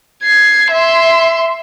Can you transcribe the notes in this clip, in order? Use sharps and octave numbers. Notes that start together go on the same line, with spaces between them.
G#6 C7
E5 C6